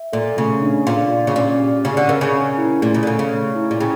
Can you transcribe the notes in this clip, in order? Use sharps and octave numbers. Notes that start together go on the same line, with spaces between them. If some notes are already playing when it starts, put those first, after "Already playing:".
Already playing: E5
A#2 A4
C#3 A3
D4
A#2 F5
D5
C#3
A#2 C#4
G4
C#3 D5
D3
C#3 A#4
C#3
C#4
E4
A#2 A3
C#3
D3
C#3 A4
C#3
A3
E4
A#2
C#3 G5